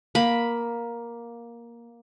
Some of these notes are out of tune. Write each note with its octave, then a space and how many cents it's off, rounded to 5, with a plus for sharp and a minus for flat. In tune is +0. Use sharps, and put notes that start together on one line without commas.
A#3 +10 B5 +0